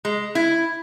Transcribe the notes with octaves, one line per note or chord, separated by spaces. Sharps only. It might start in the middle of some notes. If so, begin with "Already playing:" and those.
G#3
E4